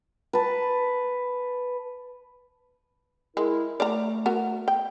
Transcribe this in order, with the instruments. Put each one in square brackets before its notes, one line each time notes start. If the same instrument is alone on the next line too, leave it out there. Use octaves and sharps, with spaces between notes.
[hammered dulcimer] B4 A5
[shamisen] G#3 [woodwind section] E4 A#4
[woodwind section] A3 [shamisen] D5 F5 A#5
[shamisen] B3 F#4 A#4
G5